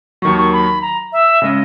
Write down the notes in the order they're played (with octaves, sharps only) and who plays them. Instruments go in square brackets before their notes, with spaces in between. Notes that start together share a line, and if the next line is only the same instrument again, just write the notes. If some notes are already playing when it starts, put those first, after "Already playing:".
[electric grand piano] D#2 D#3 F#3 [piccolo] C#6
[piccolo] C#6
B5
A#5
E5
[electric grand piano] C#3 G#3 C#4 [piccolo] D#5